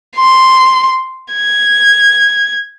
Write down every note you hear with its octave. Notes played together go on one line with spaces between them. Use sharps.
C6
G#6